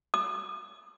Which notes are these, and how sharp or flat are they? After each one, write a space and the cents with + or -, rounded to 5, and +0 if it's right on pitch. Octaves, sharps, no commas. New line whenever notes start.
D#6 -45